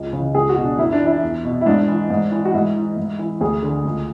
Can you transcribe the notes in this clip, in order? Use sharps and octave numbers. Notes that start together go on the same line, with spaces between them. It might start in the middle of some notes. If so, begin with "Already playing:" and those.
Already playing: C#2
C#3 E3
C#2 G#4
F#4
B2
D4
F#2 E4
D4
E3 E4
E2
B2
E4
G#2 D4
E3
G#2
E3
F#4
G#2 E4
E3
G#2
E3
D2 G#4
D3
C#2